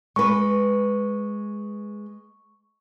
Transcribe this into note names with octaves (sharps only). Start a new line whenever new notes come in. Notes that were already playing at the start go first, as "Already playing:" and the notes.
G#3 B4 C#6